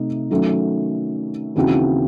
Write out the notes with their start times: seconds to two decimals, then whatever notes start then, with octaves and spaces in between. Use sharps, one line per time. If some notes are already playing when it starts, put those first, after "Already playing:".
Already playing: C3 A3 D#4
0.31 D#3 F#3 A3 C#4
1.56 D#2 C#3 E3 C4 F#4